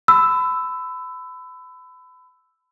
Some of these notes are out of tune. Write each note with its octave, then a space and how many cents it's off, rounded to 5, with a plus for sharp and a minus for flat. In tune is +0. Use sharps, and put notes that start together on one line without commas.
B5 +30 E6 +0